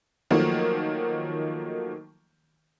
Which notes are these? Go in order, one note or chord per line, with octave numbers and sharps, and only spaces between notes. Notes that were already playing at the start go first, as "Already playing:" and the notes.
D#3 F3 F#3 A3 A#3